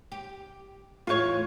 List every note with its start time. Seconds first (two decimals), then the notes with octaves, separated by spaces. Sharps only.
0.12 G4
1.07 E2 A2 E3 F4 C#5